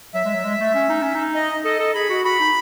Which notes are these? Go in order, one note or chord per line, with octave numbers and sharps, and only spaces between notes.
F#3 E5
G#3
F#3
G#3
A3
C#4
D#4
C#4
D#4
D#5
A4 D#5
A4
G#4 B5
F#4
F#4 B5
D#4